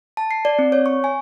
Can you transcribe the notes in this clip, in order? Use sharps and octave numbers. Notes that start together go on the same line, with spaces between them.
A5
C7
D5
C4
C#5
C#6
G#5